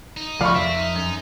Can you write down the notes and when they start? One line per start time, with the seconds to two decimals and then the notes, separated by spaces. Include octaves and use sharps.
0.17 D#4
0.41 C2 F3 A3 F4 D5 F5 B5 C#6
0.55 F2 C4 E5
0.76 D#4
0.95 F#2